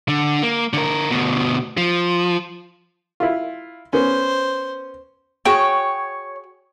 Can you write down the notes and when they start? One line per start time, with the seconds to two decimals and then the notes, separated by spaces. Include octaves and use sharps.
0.09 D3
0.42 A#3
0.73 D3 A#4
1.11 D2 B2
1.77 F3
3.20 E4 F4
3.93 B3 C#4 C5
5.46 F#4 G#4 C#5 G5